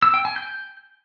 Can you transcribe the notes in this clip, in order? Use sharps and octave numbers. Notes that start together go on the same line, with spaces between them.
E6
G5
G#5
G6